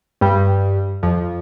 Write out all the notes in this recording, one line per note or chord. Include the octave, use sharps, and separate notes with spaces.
G2 G3
F2 F3